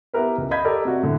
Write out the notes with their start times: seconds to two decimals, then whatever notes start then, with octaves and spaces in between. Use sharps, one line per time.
0.14 B3 E4 G4 A#4 B4
0.38 C#2
0.51 D#5 F5 B5 G6 G#6 B6
0.65 G4 A4 A#4 D5 D#5
0.85 C3 F#4
1.02 A2 D3